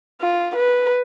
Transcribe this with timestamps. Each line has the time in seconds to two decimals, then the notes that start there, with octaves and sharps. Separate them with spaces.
0.22 F4
0.56 B4